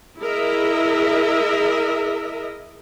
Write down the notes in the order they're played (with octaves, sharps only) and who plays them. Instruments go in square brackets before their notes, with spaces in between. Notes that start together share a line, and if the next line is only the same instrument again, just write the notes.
[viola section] E4 G#4 A#4 D#5 E5